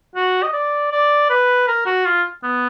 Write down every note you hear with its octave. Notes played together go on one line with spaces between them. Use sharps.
F#4
D#5
D5
D5
B4
A#4
F#4
F4
B3